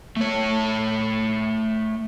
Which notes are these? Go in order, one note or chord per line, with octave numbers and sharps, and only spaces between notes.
A3 C#5